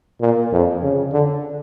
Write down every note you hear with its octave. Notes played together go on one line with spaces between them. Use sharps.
A#2
F2
C#3
D3